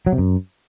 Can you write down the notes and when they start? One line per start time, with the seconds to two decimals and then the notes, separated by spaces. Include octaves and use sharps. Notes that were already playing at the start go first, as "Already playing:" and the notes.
0.06 F#3
0.12 C3
0.18 F#2